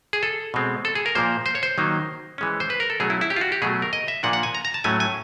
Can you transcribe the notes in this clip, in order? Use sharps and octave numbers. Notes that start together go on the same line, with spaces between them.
G#4
A4
B2 G#3 C4
A4
G#4
A#4
A#2 F3 A#3 C5
C5
C#5
C5
D#3 F#3 A#3 D#4
E3 G#3 C#4
C5
B4
A#4
A4
B2 F#3 A3 C#4 G#4
E4
E4
G4
F4
F#4
G4
B2 F#3 A3 G#4
A#4
D#5
E5
A#2 F3 A#3 D4 F#5
F#5
G#5
A#5
A#5
A5
A2 F#3 A3 C#4 G#5
G#5